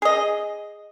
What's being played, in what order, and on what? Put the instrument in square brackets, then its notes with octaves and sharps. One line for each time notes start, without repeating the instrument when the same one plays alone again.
[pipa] G#4 D#5